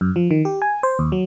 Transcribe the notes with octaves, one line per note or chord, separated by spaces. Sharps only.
F#2
F3
D#3
G4
G#5
C5
D#2
F#3